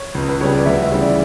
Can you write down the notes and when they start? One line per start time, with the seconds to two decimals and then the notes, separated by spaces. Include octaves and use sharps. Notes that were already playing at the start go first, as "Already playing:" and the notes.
Already playing: C#5
0.15 C#2
0.29 B4
0.41 C#3 G3 C#5
0.54 D5
0.66 D2 E5
0.83 E5
0.92 C#3 E3 G3
1.01 D5